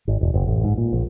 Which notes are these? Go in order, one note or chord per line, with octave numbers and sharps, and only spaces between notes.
G#1
E1
F#1
A1
G#2
A#2
A#1